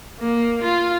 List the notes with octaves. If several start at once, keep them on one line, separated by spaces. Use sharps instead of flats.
A#3
F4